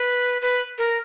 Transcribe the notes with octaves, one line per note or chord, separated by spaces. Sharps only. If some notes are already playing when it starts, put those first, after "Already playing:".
Already playing: B4
B4
A#4